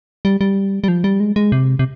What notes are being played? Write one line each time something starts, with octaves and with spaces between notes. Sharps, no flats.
G3
G3
G3
F3
G3
G#3
G#3
C3
C3